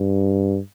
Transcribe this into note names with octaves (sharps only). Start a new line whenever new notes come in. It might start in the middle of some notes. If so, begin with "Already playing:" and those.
Already playing: G2